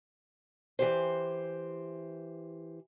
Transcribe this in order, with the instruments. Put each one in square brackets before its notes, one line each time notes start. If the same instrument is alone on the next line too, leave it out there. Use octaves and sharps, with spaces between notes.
[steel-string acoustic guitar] E3 G4 C5